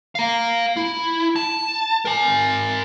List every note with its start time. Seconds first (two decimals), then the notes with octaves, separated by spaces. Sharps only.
0.15 F5 A#5
0.77 E4
1.36 A5
2.05 A#4 G#5